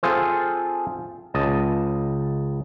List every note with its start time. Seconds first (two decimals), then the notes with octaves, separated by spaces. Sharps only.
0.03 C4 F4 G#4 A4 C5
1.34 C#2 D#5 A5